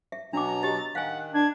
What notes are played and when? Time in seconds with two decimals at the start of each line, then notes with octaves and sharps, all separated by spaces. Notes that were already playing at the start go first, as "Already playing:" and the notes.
0.12 E5
0.33 B2 F#3 D4 A#5 D6
0.63 G4 D#5 A6
0.95 D#3 F5 F#5 G#5
1.34 D4 G#6